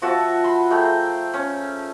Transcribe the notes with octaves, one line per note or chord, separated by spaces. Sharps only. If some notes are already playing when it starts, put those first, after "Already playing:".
F3 F#4 E5 A5
B5 C6
A3 G#4 G5 A#5
C#4